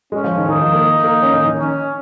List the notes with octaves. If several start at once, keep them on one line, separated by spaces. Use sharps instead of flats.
G#3 C#4
F3
D#3
D#3 D#4
F3
A#3
A#3
C#4
D#3
D#3
C#4